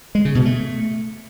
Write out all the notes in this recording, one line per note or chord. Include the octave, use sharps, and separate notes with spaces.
G#3
C#3
B2
A3